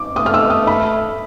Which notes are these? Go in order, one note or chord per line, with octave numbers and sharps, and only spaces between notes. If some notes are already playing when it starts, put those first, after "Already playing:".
Already playing: D6
A3 D#6
F6
E6
D#6
B5